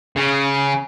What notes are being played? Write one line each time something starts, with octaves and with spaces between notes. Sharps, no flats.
C#3